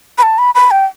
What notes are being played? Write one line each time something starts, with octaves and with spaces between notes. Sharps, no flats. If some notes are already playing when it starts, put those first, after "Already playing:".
B5
A5
B5
B5
G5